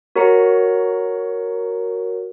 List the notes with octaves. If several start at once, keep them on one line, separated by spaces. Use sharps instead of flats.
F#4 A#4 C#5 F#5 A#5 C#7